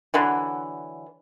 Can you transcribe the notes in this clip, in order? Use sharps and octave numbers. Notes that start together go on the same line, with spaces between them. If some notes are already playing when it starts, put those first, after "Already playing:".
D3 E3 F#3